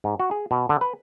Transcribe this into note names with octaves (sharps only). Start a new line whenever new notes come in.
G#2
F#4
G#4
B2
D3
B4